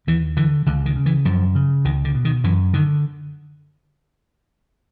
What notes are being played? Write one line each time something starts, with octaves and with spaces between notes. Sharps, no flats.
D#2 E3
D3 E3
C#2 D3
D#3
C#3
E3
F#2 F3
C#3
C#2 D#3
D3
B2
D#3
F#2 E3
D3 D#3